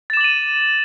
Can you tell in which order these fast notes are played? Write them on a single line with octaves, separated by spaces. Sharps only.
A6 E7 D6 F#7 D#7